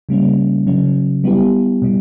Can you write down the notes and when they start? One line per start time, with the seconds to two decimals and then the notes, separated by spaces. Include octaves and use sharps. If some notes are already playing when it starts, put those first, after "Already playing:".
0.09 C#3 G3 A#3 C#4
0.67 C#3 F#3 C#4
1.24 G3 B3 E4 G4
1.82 B2 G3